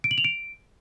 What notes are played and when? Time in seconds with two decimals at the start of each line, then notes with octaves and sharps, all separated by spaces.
0.04 D7
0.11 F#7
0.18 F7
0.24 D7